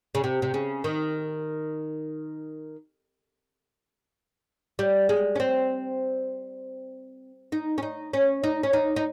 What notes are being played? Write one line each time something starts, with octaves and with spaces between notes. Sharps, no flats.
C#3
C3
C3
C#3
D#3
G3
G#3
C#4
C4
D#4
C#4
D#4
C#4
D#4
C#4
D#4
D#4